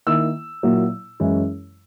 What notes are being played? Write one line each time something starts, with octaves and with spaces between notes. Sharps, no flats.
D#3 A#3 E4 E6
A#2 F#3 A#3 E4
F#2 E3 G#3 C#4 E4